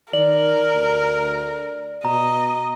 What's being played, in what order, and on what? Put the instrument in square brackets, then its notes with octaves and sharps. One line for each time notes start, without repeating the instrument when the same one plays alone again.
[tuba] D#3 [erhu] A#4 [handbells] D5 [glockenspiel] F#7
[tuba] D2
[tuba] B2 [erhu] D#5 [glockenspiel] A#5